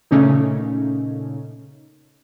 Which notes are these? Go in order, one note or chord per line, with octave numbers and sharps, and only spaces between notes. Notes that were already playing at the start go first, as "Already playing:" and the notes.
A#2 C#3 A3 A#3 C#4 D#4